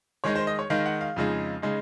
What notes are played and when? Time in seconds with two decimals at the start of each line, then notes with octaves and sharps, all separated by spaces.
0.24 D#3 G#3 D#4 C#5
0.36 C5
0.47 D#5
0.59 C#5
0.70 D#3 G#3 D#4 F5
0.86 F#5
1.01 F5
1.16 F2 C#3 G#3 D#4
1.62 C#3 G#3 D#4